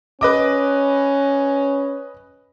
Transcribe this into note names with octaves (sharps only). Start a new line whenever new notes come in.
C#4 B4 D#5 D6